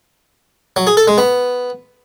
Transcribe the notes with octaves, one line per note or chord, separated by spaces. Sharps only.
F#3
G#4
A4
G#3
B3